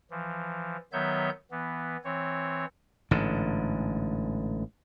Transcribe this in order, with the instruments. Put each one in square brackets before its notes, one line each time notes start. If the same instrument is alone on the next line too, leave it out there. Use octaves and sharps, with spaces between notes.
[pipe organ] E3 F3
D#3 F#3 B3 C#5 E5 G6
E3 B3
E3 C4 C#5
[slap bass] A1 G#2 D3